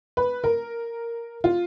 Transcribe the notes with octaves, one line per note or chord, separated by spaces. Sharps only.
B4
A#4
F4